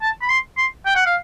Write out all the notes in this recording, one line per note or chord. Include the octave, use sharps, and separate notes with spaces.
A5
B5
C6
C6
G5
F#5
F5